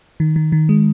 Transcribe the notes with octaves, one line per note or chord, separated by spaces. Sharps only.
D#3
D#3
D#3
G#3